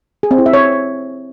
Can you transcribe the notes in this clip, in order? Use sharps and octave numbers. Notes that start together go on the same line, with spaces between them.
G#4
C4
E4
E5
C#5